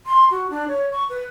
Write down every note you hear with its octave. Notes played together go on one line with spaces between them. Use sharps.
C6
F#4
D4
C#5
C#6
B4